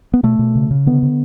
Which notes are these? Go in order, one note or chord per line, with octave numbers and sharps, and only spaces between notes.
B3
B2 A3
B2
C#3
C#3
D3 B3
D3